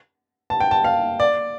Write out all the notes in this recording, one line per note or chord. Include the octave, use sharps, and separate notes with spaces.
A5
G5
A5
F5
D5